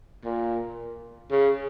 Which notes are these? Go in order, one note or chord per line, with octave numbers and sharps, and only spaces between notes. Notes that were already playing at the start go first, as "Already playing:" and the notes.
A#2
C#3